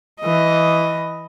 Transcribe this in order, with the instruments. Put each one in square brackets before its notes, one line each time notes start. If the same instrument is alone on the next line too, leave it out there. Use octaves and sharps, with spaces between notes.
[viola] E3 D#5